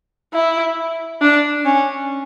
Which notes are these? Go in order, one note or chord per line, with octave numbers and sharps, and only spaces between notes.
E4
D4
C#4